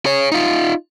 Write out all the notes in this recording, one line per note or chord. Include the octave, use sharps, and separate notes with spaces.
G#4 C#5
D#4 F4